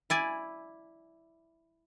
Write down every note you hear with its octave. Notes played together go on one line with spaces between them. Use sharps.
E4 D5 G#5